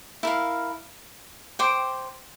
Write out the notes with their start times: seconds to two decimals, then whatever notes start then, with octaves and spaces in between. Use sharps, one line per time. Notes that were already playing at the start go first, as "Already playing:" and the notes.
0.23 E4 A#4 F5
1.59 C5 G5 D6